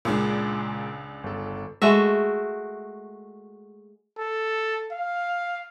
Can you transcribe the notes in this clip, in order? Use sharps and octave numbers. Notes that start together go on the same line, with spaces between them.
C#2 A#2 G#3 D4
G1 A4
G#3 A3 F#4 E5
A4
F5